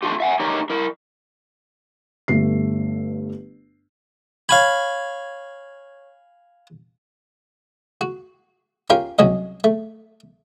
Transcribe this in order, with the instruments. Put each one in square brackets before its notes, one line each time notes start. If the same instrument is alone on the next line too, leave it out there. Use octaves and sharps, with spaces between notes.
[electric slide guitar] A3 D4 F4 G4
E5 F#5 G#5
D#4 G4 A#4 C#5 D5
E4 A#4
[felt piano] G1 G2 A3 C7
[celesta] C#5 C#6 G#6 [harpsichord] F5 G#5 B5
[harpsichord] F#4
C#4 F4 G4 A#4 F5 G5
C2 F#3 C#4 D#5
A3